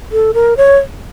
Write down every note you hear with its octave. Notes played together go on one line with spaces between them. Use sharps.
A4
A#4
C#5